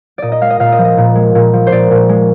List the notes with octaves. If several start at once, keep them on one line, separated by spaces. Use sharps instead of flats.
A#2 D5 D#5
D#5
G#3 F5
D#5
A#2 F5
D#5
F3
D#5
A#2
G#3
A#2
F3
C5
A#2 D5
A#2
G#3